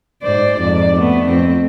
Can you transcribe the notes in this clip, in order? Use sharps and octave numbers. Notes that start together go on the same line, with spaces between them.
G#2 C5 D5
F2 G#2 D5
A3 B3
F2 C4